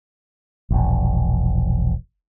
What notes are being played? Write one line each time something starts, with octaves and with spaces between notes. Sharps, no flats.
E1 A#1